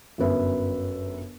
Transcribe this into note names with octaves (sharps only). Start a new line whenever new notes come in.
G1 F#2 B4 E5